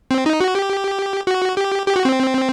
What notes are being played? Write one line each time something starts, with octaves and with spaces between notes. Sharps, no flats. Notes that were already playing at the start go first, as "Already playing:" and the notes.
C4
D#4
F#4
G4
F#4
G4
G4
F#4
C4